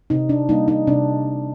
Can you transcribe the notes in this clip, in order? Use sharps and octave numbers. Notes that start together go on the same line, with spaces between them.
C3 D#4
D4
G3 A#3 D#4
D#4
C3 D4